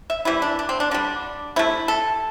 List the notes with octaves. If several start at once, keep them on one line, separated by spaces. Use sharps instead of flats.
E5
C3 E3 G3 E4
D4
D4
C4
D4
D3 G3 D4
C3 A3 E4
A4